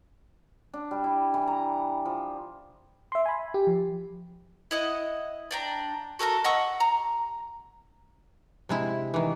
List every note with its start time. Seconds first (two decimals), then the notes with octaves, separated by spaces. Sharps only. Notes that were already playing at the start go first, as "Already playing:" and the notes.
0.74 D4
0.91 G3
1.04 E4
1.34 E3
1.47 A#5
2.06 F3
3.12 E5 C6
3.26 G#5 B5
3.54 G4
3.67 F3
4.71 E4 D#5 F#5
5.51 D4 G5 A#5
6.19 F#4 A4 A#4 A#5
6.44 D#5 F#5 C#6 E6
6.80 A#5
8.69 C3 G#3 E4
9.14 D#3 E3